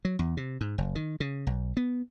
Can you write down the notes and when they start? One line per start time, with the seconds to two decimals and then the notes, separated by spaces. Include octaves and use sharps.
0.05 F#3
0.19 E2
0.37 C3
0.61 G#2
0.78 F#1
0.95 D#3
1.20 C#3
1.47 B1
1.77 B3